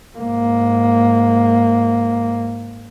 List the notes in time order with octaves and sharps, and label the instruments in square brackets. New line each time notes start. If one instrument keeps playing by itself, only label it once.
[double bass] G#2 A#3